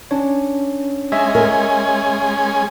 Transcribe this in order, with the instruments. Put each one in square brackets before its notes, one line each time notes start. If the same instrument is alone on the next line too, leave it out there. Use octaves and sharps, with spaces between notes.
[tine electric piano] C#4 D4 C#5
[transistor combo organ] G#3 C#4 G#5 [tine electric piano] D#5 E5
[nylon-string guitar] A#4